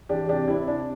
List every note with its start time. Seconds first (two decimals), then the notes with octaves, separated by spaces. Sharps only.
0.09 E3 D4 G4
0.28 C3 D4 G4
0.48 C4 E4
0.67 C3 D4